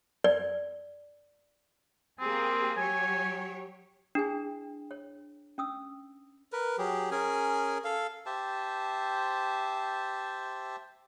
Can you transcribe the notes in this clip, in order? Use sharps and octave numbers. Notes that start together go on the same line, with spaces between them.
D5
A#3 C4 G4 G#4
F#3 G4 C#5 G#5
D4 E4 G#4 G#5
C#5
C#4 D#6 E6
A#4 B4
F#3 G4 G#4
C#4 G#4 A#4 G#5
A4 F5
G4 C5 E5 A5